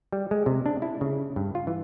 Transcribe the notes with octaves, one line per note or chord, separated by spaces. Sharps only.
G3
G#3
C3
D4
E4
C#3
G2
F4
E3